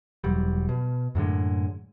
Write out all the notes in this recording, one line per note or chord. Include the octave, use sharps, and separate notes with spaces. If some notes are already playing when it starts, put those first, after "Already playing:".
E1 F#3 G3
B2
F#2 A2 D3 G#3